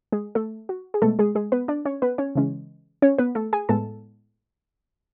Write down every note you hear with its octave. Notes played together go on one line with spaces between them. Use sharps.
G#3 G#4
A3 A4
F#4
G#4
B2 G#3 A3 B3 A4
G#3 G#4
G#3 G#4
B3 B4
D4 D5
C#4 C#5
B3 B4
C#4 C#5
C#3 E3 G#3 C#4
C#4 C#5
B3 B4
A3 A4
G#4 G#5
A2 G#3 B3 A4 A5